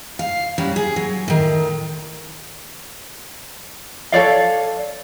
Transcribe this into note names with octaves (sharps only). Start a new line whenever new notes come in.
F5
C#3 F#3 G3
G#4
F#3
A2 D#3
A4 C#5 D5 F5